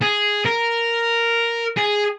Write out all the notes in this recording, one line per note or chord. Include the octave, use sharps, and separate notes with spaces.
G#4
A#4
G#4